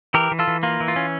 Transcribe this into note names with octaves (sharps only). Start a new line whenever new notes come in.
E3 G4 A#4
E3
F4 A4
E3
A#3 F4
E3
F4
C#4